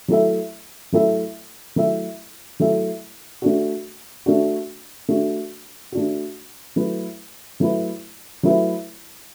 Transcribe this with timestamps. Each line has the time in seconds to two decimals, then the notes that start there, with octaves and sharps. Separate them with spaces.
0.08 F#3 A3 E4 A4 E5
0.92 F#3 A3 E4 A4 E5
1.76 F#3 A3 E4 A4 E5
2.60 F#3 A3 E4 A4 E5
3.42 A3 D4 F#4
4.26 A3 D4 F#4
5.09 A3 D4 F#4
5.92 A3 D4 F#4
6.76 F#3 A3 E4 B4
7.60 F#3 A3 E4 B4
8.43 F#3 A3 E4 B4